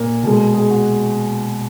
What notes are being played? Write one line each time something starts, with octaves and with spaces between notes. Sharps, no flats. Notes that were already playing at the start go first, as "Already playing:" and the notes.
Already playing: A#2 A#4
B2 G#3
G#4
F#4